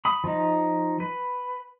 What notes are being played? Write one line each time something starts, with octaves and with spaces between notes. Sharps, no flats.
B5 D#6
F3 D#4
B4